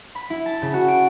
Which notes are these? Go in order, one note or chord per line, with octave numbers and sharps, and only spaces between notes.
B5
E4
A5
C#3
F#4
D7